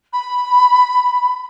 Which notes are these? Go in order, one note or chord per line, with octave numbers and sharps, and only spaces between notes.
B5